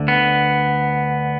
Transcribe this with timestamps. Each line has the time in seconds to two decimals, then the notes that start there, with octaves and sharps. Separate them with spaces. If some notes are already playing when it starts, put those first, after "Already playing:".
Already playing: D2 D3
0.08 B3